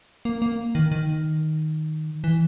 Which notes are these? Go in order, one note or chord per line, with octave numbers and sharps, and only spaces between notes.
A#3
A#3
D#3
D#3
E3